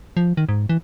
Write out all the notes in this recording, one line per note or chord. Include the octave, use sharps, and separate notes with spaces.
F3
D#3
G#2
E3